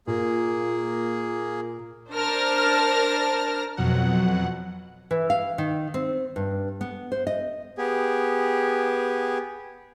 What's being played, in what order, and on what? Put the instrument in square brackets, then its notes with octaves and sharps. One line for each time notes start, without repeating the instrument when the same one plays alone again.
[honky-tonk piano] A#2 [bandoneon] A#3 G#4
[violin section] D4 A#4 C5 A5 F6 A#6
[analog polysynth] F2 B2 F#3 F#5
[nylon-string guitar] E3
F5
D#3
C4
G2
B3
C5
D#5
[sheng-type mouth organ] B3 G4 G#4